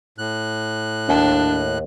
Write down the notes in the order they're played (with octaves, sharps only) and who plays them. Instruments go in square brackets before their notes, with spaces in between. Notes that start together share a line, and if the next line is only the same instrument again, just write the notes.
[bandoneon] A2 F#6
[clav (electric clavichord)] D#2 [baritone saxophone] D4